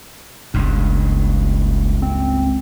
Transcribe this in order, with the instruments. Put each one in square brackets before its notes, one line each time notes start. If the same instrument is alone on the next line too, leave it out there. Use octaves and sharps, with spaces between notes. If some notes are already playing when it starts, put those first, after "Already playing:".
[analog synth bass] F#1 [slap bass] C#2 G2
[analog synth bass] C4